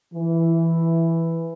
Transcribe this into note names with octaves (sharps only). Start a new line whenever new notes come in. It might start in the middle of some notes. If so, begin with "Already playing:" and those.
E3